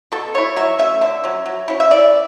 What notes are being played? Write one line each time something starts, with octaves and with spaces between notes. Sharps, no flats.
B2 A4
A3 E4 C#5
F#3 E5
A3 C#4 E5
D3 E5
F#3 C#4
F#3
C#4 E4
E5
E3 D5